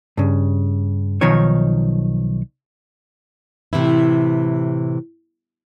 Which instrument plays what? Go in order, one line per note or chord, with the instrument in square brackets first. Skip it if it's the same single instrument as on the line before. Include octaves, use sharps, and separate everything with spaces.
[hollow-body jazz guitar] G2 C#3
B1 D#3 F3 D#4 C#5
[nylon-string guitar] A2 C3 E3 E4